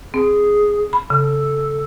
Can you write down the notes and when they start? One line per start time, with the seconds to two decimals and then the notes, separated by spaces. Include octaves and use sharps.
0.14 C4 G#4
0.93 B5
1.10 C#3 A4